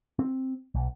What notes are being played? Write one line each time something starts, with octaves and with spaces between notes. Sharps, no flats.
C4
B1